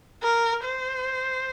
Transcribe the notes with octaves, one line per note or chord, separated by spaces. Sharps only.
A#4
C5